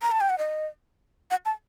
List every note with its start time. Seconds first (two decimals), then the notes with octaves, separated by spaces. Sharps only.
0.02 A#5
0.12 A5
0.21 G5
0.30 F#5
0.38 D#5
1.31 F#5
1.45 A5